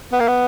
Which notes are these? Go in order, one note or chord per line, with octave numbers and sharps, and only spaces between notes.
B3
A#3
B3